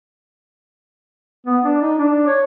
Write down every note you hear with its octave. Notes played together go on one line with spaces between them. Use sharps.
B3
D4
D#4
D4
C#5